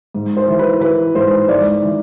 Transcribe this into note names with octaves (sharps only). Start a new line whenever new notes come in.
G#2
C5
E3
B4
E3 B4
G#2 C5
G#2 D5
E3